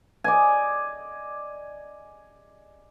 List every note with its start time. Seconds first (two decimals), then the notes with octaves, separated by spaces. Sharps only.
0.24 D5 D#5 G#5